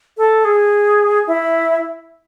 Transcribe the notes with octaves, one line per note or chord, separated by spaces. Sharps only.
A4
G#4
E4